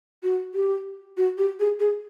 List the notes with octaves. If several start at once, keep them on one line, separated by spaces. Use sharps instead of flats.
F#4
G4
F#4
G4
G#4
G#4